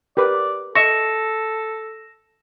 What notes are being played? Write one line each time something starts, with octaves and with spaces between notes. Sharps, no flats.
G4 A#4 B4 D5
A4 D#5 E5 C#6 A#6 E7